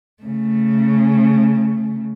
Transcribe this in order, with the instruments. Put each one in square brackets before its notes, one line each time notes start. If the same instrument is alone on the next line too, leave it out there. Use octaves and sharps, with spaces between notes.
[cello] C#3 A3